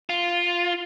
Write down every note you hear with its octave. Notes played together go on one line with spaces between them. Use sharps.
F4